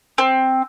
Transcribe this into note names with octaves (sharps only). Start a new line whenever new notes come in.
C4